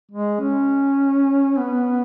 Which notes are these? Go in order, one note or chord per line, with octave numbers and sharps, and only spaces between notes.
G#3
C#4
B3